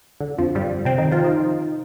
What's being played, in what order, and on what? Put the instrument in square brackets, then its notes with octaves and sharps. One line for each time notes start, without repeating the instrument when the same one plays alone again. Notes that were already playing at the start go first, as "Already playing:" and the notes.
[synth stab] D3
F2 F3
G2 G3
C3 C4
D#3 D#4
F3 F4
D#3 D#4